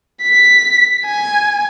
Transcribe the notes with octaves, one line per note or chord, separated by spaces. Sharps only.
B6
G#5